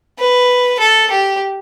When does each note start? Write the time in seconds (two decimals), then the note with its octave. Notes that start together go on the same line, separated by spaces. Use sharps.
0.19 B4
0.79 A4
1.11 G4